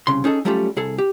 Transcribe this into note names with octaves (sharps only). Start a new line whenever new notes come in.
C2 C#3 C6
C#4 D#4 G#4 A4
F#3 G3 A3 C#4 F4 G4
C2 G#4 A4
G4